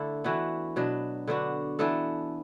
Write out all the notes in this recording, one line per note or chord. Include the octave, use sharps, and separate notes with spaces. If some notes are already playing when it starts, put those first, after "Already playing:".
Already playing: D3 A3 E4 A4
E3 B3 D4 F#4
B2 F#3 D4
D3 B3 D4 F#4
E3 B3 D4 A4